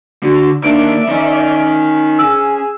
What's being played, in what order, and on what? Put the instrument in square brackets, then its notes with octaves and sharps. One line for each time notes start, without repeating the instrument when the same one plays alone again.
[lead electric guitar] D3 [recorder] F#4
[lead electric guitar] D#3 A#3 [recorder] D4 [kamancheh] D5 E5 [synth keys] D7
[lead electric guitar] D#3 D#4 [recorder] C#4
[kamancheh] G#4 [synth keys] E6